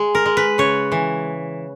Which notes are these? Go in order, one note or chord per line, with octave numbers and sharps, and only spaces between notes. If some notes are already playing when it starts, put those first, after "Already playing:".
Already playing: G#3
A#4
G#3
B4
C#3 C#5
E3